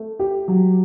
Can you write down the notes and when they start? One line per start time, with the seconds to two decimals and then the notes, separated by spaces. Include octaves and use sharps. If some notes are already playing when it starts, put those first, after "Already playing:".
Already playing: A3
0.19 G4
0.48 F#3